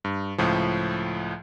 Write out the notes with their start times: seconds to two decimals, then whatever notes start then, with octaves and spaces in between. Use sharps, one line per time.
0.04 G2
0.38 C#2 A2 F3